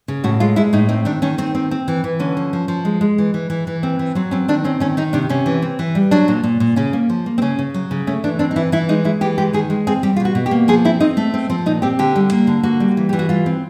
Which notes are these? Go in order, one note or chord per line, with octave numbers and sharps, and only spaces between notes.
C#3
A2 F#4
G#3 F4
G#3 E4
A2 D#4
C4 D#4
D#3 D4
D#3 C#4
D#3 C4
C4
C4
E3
E3
D3 C#4
F3
F3
F3
G#3
G#3
E3
E3
E3
E3
C4
E3
F#3 C4
C4 C#4
D#3 D4
C4 C#4
D#3 C#4
D#3 D#4
C3 D4
C3 C#4
E3
C4
E3
G3
F#3 D4
A#2
A#2
A#2
C#3 C#4
A#3
F3
A#3
C4
C#3 C#4
C#3
F#3
C#3
A3 C#4
E3 D4
C4 D4
D#4
E3 E4
E3 E4
G#3 D#4
G#3 E4
E3 G4
G#3 G4
D#3 G#4
G#3
C4 G#4
G3 G4
F4
B2
F#4
B2
G4
A#3
F3 G#4
C4 E4
C4 D#4
A3
C4
F3 C4
A#2 D#4
C4 G4
D3 G4
G3
A#3
D3
A#3 F#4
G3
E3
E3 G4
F#4
G3 F4
C4